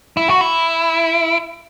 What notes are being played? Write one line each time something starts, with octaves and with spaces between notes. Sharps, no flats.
E4
F#4
E4